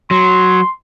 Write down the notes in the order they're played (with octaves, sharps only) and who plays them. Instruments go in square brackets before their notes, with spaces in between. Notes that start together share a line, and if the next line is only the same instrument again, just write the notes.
[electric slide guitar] F#3 [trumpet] C6